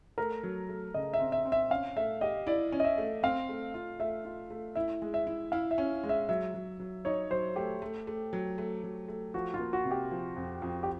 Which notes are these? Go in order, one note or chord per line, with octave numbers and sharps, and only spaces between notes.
A3 A#4
F#3
A3
C#3 D#5
E5
C4
E5
C4
E5
C#4 F5
A3 E5
G4 D#5
E4 D5
C#4
D#5
E5
A3
C4 F5
A3
F4
A3 E5
F4
A3
E4 E5
G#3
E5
E4
E4 F5
E5
C#4
G#3
E5
F#3 E5
F#3
F#3
D#4 C#5
F#3 C5
A3 G4
A3
A3
F#3
A3
F#3
A3
F3 F#4
F4
A#3
F#4
C3
G4
F3
F2
F2
G4